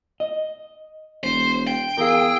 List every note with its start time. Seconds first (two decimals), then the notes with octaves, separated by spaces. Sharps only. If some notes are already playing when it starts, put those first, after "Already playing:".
0.20 D#5
1.24 E1 C5
1.67 G5
1.98 E2 G#4 A#4 F5 E6